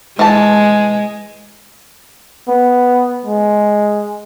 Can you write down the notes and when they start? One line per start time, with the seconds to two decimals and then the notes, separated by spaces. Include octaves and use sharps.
0.19 E3 G#3 A5
2.48 B3
3.26 G#3